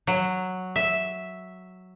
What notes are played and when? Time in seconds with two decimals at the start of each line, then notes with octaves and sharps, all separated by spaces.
0.07 F#3
0.76 E5